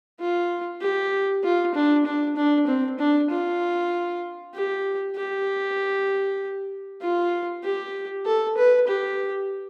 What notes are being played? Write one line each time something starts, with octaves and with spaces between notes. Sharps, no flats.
F4
G4
F4
D4
D4
D4
C4
D4
F4
G4
G4
F4
G4
A4
B4
G4